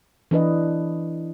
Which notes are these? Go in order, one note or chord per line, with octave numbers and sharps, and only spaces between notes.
E3 D4 B4 D#5